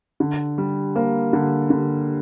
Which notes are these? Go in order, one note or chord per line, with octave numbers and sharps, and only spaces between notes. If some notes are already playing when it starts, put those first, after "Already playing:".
D3
G3
A#3
D3
D3